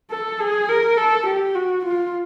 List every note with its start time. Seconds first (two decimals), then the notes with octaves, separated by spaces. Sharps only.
0.11 A4
0.40 G#4
0.69 A#4
0.97 A4
1.27 G4
1.55 F#4
1.85 F4